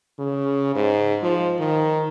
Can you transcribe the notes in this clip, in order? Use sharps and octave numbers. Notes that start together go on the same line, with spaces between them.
C#3
G#2
F3
D#3